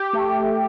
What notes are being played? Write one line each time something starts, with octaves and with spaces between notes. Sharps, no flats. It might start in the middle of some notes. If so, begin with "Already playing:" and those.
Already playing: G4
A3